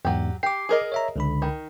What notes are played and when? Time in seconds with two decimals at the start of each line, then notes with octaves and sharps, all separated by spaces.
0.05 E2 G#2 F#3 G4
0.43 G4 D6 C7
0.69 G#4 A#4 D#5
0.92 C#5 E5 A#5
1.16 C#2 D3 B5
1.42 D#3